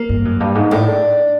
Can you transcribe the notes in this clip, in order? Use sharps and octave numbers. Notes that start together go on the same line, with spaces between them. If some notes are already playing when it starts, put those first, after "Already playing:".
Already playing: A#3
G2
F#2
G2
G#2
A2 D4